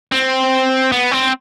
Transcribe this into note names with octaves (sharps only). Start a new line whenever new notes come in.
C4
B3
C4